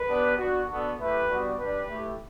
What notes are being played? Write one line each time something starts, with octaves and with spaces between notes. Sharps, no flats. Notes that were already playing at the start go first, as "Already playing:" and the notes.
Already playing: B4
B3 D4 G4
B3 D4 F#4
B3 D4 F#4 A4
A3 E4 G4 B4
G3 B3 D4 F#4
G3 D4 G4 B4
A3 E4 G4